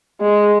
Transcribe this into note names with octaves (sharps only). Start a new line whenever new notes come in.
G#3